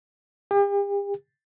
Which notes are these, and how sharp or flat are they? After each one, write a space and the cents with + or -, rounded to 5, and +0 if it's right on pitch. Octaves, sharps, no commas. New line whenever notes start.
G4 +40